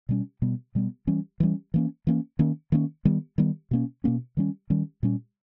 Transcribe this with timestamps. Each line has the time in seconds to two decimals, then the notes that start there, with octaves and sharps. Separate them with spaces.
0.09 B2 G3 C#4
0.42 B2 G3 B3
0.75 B2 G3 B3
1.07 E3 G3 C#4
1.40 E3 G3 C#4
1.74 E3 A#3 C#4
2.07 E3 A#3 C#4
2.39 D#3 A#3 C#4
2.72 D#3 A#3 C#4
3.05 D#3 G3 B3
3.38 D#3 G3 B3
3.71 B2 A#3 C#4
4.04 B2 A#3 C#4
4.37 D#3 G3 C#4
4.70 D#3 G3 C#4
5.03 A#2 G3 C#4